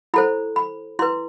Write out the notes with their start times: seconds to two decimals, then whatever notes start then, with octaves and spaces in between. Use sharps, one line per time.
0.14 E4 A4 C5 B5
0.56 B5
0.99 E4 B4 C6